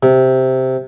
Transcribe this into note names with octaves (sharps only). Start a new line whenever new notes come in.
C3